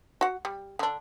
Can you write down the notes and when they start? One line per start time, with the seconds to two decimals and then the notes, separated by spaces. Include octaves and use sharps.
0.21 F#4 F#5
0.45 G3
0.79 D3 D4